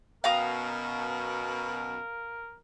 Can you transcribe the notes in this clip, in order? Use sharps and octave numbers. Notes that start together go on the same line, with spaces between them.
F#2 B2 A#4 F5 A#5 D#6